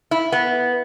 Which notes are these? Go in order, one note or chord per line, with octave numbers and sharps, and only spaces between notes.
E4
B3